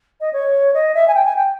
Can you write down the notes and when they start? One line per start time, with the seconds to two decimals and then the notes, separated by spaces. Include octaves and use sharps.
0.21 D#5
0.33 C#5
0.74 D#5
0.95 E5
1.08 G#5
1.14 G5
1.25 G#5
1.36 G5